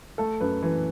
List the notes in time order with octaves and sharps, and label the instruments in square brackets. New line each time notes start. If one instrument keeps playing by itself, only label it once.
[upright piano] A3 A4
F#2 B4
E3